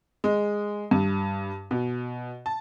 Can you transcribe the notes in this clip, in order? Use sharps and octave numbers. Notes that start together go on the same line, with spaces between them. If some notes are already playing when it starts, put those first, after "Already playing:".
G#3
G2
B2
A5